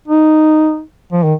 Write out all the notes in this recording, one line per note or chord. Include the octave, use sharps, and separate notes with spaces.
D#4
F3
D#3